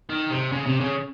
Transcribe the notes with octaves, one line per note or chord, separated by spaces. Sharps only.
D#3
C3
C#3
C3
C#3